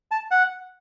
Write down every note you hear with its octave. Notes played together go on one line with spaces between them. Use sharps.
A5
F#5